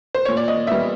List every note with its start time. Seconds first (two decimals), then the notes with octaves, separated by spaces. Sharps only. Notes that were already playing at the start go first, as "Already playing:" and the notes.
0.15 C5
0.25 A#2 C#5
0.37 D5
0.48 D#5
0.67 B3 E5
0.71 G3